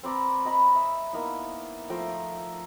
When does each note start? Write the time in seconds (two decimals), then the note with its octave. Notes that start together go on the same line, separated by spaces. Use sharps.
0.03 C4 B4 D5 A#5
0.45 D#5 G5 A#5 B5
0.75 E5
1.13 A#3 B3 D#4 E4
1.90 F3 A3 G5 A#5